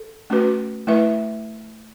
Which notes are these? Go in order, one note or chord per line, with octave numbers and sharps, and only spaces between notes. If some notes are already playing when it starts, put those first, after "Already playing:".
Already playing: A4
A3 C#4 F#4 B4
A3 E4 B4 E5